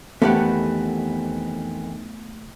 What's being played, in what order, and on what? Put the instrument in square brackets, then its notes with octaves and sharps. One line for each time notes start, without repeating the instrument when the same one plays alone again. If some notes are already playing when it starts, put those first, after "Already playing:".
[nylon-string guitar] F2 D#3 E3 [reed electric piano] A3 [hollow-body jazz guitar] B3 G4 F#5